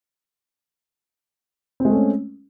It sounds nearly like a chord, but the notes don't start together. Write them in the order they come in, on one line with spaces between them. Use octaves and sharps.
C4 G#3 A3 C#4